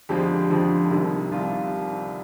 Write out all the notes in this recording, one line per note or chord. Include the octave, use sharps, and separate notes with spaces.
F2 D3 F3 G#3 G4
F2 D3 F3 G#3
C2 C3 D#3
C2 C3 D#3 F4